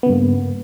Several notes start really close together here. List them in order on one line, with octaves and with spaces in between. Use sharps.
B3 C#3 G2 A#3